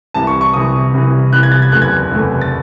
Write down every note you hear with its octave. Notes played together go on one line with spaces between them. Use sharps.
C2 C3 E3 A5
C#6
C#6
C2 C3 E3 D#6
C2 C3 E3
C2 C3 E3 F#6
G#6
A6
G#6
F#1 E2 C3 E3 A3 F#6
G#6
F#1 E2 C3 E3 A3
A6